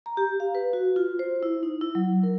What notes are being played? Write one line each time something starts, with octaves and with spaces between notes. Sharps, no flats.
A#5
G4
F5
B4
F#4
F4
C5
E4
D#4
E4
F#3
A#4